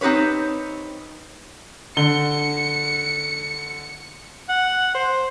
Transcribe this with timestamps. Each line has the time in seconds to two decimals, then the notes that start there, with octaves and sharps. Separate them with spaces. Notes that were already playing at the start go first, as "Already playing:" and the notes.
0.01 C4 D#4 G4 B4 C#5
1.97 D3 C#7 G7
4.49 F#5
4.95 C5